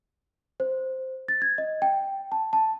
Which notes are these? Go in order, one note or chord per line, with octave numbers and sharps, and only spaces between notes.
C5
A6
G#6
D#5
G5
A5
A5